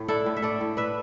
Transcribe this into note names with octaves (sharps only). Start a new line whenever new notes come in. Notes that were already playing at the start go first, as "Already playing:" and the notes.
Already playing: A2 A3
D4 E4 A4
A2
E5
A3 A4 D5
A2
D4 B4 E5